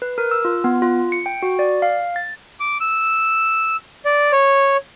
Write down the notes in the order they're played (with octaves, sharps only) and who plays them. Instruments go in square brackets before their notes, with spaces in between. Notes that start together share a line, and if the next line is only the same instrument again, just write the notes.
[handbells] B4
A#4
E6
F4
B3
F4
C#7
G5
F#4
D5
F5
A6
[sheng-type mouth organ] D6
E6
D5
C#5